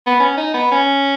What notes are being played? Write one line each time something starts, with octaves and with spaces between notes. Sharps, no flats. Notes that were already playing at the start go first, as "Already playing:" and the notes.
B3
C#4
D#4
B3
C#4